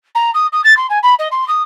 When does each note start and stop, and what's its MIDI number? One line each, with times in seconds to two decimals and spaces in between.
0.15 0.31 82
0.34 0.47 87
0.52 0.61 87
0.64 0.76 93
0.77 0.87 84
0.90 0.98 80
1.03 1.14 83
1.19 1.28 75
1.31 1.47 84
1.48 1.62 87